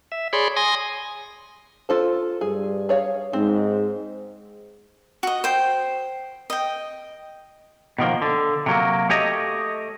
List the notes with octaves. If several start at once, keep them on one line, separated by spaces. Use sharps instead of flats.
E5
G#4 C#5 D5 B5 C6
G#5 C6 D#6 A#6
F4 A4 C5
G2 G#4
G#4 C#5 F5
G#2 C4
F#4 D#5
C5 G5
D#5 G5
B2 D#3 F3 A#3
D3
C3 F#3 A#3
A3 G4 C#5 D#5